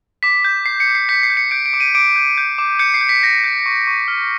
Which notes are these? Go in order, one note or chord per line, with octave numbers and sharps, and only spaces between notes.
D6 B6
G6
D6 C7
C#7
D6
C7
G6 B6
C7
G6
C#7
G6 D7
D7
D6
D#7
D6 D7
G6
G6
D6
G6 C#7
C7
G6
B6
G6 A#6
G6
C#6
C#6
F6